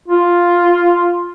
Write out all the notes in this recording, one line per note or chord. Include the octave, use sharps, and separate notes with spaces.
F4